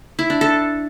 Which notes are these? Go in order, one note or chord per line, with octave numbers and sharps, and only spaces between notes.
E4
D4
A4